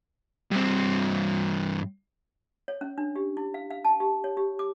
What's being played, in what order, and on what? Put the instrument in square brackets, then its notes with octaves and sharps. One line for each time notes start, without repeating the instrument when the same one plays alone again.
[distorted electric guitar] G2 C4
[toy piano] C#5
C#4
D4
G4
E4
F5
F5
A5
G4
C#5
G4
D6